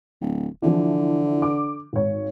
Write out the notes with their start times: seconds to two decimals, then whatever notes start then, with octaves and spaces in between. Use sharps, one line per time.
0.21 D1
0.62 D3 E3 F3
1.42 D6
1.93 G#1 C#5